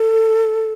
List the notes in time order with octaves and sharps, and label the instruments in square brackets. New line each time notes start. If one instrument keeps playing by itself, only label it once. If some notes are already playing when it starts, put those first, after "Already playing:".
Already playing: [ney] A4